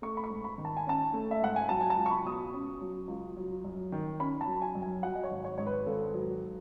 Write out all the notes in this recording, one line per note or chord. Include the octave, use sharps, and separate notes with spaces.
A3 C#6
B5
C#6
G#2
B5
D#3
A5
G#5
C#4 A5
A3
E5
G#2 F#5
G#5
F#3 A5
G#5
A5
C#2
C#6
B5
B2 D#6
C#6
C#4
F#3
C#2
F#3
F#2
D#3
C#4 B5
A5
F#3
G#5
F#2
G#5
F#3 F#5
D#5
C#5
G#1
C#5
G#2 C#5
B4
G#1 A4
F#3